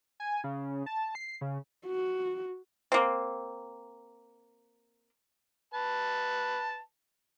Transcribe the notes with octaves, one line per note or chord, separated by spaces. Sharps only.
G#5
C#3
A5
C7
C#3
F#4
A#3 C4
B4 A5